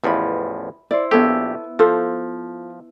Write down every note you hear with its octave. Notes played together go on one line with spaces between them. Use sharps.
A1 E2 F3 E5 B5
E4 C5 D5
A#1 B3 G4 A4 C#5 E6
F3 F4 A4 C5